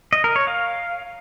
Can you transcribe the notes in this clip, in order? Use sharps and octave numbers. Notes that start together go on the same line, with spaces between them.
D#5
A#4
C#5
F5